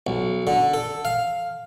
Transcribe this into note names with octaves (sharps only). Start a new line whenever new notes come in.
B1
D3
A4
F5